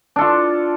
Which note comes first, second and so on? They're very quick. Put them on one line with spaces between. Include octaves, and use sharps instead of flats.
D4 A4 F4